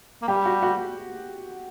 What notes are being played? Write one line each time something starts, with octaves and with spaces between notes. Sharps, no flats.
A#3
G3 G4
F#4
F#4